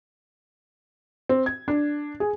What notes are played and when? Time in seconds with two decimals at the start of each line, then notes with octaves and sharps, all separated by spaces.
1.29 C4
1.46 G#6
1.68 D4
2.20 G#4